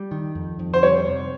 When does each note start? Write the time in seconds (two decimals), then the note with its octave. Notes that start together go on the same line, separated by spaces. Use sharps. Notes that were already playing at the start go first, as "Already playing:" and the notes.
Already playing: G3
0.11 D#3
0.35 F2
0.59 F2
0.74 C5
0.83 G3 C#5
1.07 C3